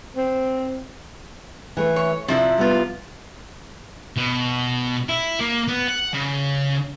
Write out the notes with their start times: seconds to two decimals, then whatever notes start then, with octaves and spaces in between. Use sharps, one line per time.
0.17 C4
1.77 E3 A3
1.96 C#5
2.28 C3 F3 E4 D5 E5
2.58 G3 B3 F4
4.17 B2
5.09 E4
5.40 A#3
5.68 B3
5.87 F#5
6.13 C#3